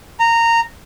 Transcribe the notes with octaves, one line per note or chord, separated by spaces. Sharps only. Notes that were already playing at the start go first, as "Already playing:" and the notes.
A#5